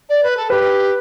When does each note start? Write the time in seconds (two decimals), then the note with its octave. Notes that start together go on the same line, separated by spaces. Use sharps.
0.09 D5
0.23 B4
0.37 A4
0.50 G4 B4